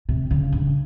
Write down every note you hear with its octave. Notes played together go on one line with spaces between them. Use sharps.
C3
C#3
G2